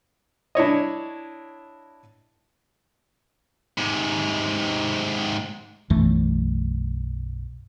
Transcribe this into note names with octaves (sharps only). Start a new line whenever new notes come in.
D4 E4 C#5 D#5
G#2 C3
B1 F#2 E3 A3